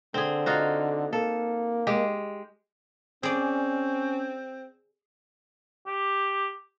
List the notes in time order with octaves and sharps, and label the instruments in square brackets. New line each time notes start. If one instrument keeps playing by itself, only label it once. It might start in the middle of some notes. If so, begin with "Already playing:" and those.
[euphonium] D3 [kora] C4 G#4
[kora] D#4 F4 F#4
[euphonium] A#3 [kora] A4
[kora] G#3 G4
[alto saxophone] C4 [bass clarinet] C#4 [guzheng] G#4 D5
[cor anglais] G4